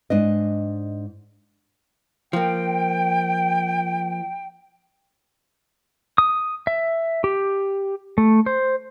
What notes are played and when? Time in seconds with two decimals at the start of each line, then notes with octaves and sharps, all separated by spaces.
0.10 G#2 D4 D#5
2.33 F3 A#3 G5
6.18 D#6
6.67 E5
7.24 G4
8.18 A3
8.46 C5